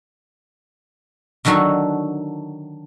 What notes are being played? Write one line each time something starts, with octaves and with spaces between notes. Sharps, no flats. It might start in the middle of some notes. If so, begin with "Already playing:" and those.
D3 D#3 F#3 F#4 A4